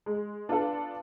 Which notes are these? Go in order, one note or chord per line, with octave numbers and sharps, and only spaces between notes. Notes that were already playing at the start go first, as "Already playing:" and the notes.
G#3
B3 D4 F4 A4